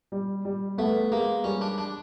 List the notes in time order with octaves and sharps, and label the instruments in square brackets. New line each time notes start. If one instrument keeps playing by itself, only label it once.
[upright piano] G3
G3
[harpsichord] A3 [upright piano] B3
[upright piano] G#3 [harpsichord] A#3
[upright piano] G3 [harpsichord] C#4
[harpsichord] D4
D4